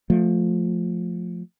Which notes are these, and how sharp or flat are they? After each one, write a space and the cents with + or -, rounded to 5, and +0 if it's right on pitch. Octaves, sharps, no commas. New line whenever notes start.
F3 +15 A3 +0